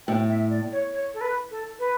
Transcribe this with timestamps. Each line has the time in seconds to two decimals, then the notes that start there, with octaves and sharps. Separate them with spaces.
0.07 A2 G5
0.30 E5
0.50 D5
0.72 C#5
0.93 C#5
1.14 A4
1.21 B4
1.51 A4
1.79 B4